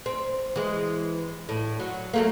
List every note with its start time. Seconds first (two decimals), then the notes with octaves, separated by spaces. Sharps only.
0.06 C4
0.56 E3 G#3
1.49 A2
1.80 F#3
2.14 F#3 A3 A#3